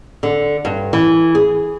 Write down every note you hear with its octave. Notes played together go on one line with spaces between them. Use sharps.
D3
G2
E3
G#4